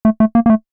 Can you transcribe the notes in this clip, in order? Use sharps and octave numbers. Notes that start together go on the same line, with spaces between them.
A3
A3
A#3
A#3
A3